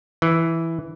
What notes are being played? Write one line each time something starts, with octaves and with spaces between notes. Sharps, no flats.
E3